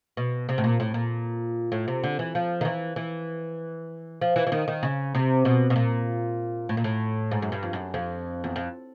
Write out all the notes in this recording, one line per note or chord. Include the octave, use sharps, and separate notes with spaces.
B2
C3
A2
A#2
A2
A#2
A2
C3
D3
E3
F3
D#3
E3
E3
F3
E3
E3
D#3
D#3
C#3
C3
B2
B2
A#2
A2
A#2
A2
G#2
F#2
G2
F2
F#2
F2
E2
F2